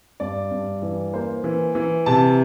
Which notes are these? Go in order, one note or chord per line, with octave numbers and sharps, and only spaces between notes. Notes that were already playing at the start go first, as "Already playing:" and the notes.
G2 D5
G2
E3
A#3 C5
E3
E3
C3 A5